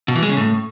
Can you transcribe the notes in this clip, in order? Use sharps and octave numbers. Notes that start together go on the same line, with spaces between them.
B2
E3
G#3
C#3
A2